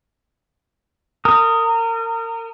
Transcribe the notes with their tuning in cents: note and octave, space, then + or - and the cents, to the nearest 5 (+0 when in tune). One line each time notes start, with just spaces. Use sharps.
A#4 -30 D#6 +0